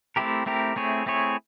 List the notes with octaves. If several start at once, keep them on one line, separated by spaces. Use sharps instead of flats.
A3 C4 E4 G4 A#4
A3 C4 E4 G4 A#4
A3 C4 E4 G#4 C#5
A3 C4 E4 G#4 C#5